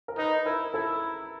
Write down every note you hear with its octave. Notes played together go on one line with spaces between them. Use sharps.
A#4
D#4 B4
E4 A#4
E4 A4